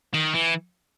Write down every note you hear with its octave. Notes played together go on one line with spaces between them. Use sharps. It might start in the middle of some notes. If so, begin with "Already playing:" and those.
D#3
E3